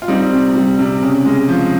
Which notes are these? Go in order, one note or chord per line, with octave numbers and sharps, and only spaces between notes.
F4
G3 C4 D#4
C3
G3
C3
C#3
G#3
F3